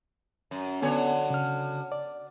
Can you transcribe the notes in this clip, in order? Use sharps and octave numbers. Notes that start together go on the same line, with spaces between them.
F#2
D3 F#3 B3 A4 C#5 G#5
C#3 F6
D5